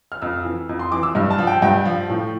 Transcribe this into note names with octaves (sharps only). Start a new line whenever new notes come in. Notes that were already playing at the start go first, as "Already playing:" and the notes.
F6
F2 E6
E3
F2
C6
E3 D6
E6
G2 F6
A5
F3
G5
G2 G5
F3
A2